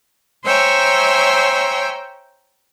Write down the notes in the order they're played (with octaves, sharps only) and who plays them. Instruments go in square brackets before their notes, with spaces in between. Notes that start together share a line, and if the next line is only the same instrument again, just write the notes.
[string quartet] C5 C#5 E5 G5 G#5 A#5